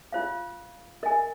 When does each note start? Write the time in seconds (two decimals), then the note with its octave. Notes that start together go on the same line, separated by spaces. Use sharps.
0.12 F4 C5 F5
1.03 A#4 D#5 G#5